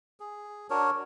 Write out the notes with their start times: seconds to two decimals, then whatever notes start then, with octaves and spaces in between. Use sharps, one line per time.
0.20 G#4
0.70 D4 F#4 A#4 C#5